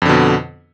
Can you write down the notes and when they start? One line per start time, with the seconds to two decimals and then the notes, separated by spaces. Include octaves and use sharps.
0.02 F2
0.05 D3
0.09 B2